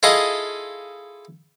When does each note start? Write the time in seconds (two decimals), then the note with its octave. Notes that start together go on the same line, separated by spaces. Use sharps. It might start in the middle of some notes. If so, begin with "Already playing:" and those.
0.03 E4 F4 G#4 A4 D#5